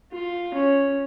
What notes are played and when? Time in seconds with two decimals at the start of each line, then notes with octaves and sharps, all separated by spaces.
0.12 F4
0.54 C#4